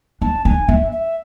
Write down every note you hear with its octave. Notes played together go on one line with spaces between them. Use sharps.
D4 A5
D4 G#5
D4 E5
E5